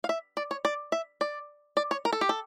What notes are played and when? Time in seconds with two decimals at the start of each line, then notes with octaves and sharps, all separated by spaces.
0.04 F5
0.09 E5
0.37 D5
0.51 C#5
0.65 D5
0.92 E5
1.21 D5
1.77 D5
1.91 C#5
2.05 A#4
2.13 A4
2.21 G4
2.29 A4